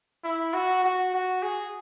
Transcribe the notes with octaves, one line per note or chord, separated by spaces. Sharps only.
E4
F#4
F#4
F#4
G#4